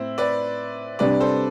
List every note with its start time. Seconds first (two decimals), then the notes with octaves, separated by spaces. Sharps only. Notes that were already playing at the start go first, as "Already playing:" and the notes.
Already playing: A2 C4 E4
0.18 B4 D5
0.99 C3 G3 D4 B4 D5
1.20 A4 C5